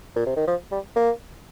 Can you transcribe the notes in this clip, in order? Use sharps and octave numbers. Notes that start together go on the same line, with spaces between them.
A#2
C3
D#3
F3
G3
A#3